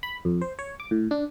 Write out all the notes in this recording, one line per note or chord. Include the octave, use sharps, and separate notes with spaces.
B5
F2
C5
C#5
D6
A2
D4